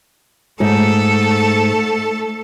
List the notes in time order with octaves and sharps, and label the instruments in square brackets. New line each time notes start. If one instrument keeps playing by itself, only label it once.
[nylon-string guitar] G#2 [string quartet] A3 A4